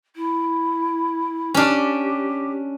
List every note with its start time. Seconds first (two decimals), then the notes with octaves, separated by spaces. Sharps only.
0.16 E4
1.54 C#4 D4 G4